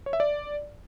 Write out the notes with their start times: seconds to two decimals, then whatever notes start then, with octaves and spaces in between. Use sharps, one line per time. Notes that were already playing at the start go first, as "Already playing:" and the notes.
0.06 C#5
0.13 E5
0.20 D5